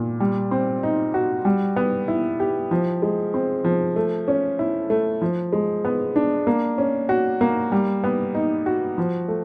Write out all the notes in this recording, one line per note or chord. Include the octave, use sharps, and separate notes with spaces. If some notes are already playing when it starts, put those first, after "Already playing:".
Already playing: A#2
G3
C4
D#4
F#4
G3
B3
E4
G4
F3
G#3
C4
F3
A3
C#4
E4
A3
F3
G#3
B3
D4
A#3
C#4
F#4
A#3
G3
B3
D#4
F#4
F3
A3